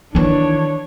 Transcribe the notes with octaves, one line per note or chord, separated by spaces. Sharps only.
D#3 E3 D4 C#5